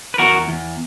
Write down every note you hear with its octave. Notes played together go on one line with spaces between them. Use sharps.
B4
E2 F#4 A#4
E2